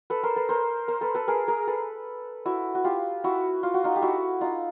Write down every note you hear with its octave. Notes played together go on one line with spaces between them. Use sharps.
A4 B4
A#4 C5
A4 B4
A#4 C5
A#4 C5
A4 B4
A4 B4
G#4 A#4
G#4 A#4
A4 B4
E4 F#4
F#4
F4 G4
E4 F#4
F4
F#4
D#4 F4
G4
E4 F#4
D#4 F4